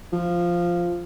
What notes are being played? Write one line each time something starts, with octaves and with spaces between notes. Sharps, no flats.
F3